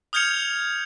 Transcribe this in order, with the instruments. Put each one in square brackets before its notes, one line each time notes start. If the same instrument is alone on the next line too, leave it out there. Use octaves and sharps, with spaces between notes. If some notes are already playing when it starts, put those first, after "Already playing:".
[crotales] D#6 F6 G6 G#6 C#7 F7